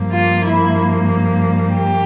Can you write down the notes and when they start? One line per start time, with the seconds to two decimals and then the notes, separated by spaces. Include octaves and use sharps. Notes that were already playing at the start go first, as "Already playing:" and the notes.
Already playing: G2 F3 A#3
0.12 F4
0.45 E4
1.74 G4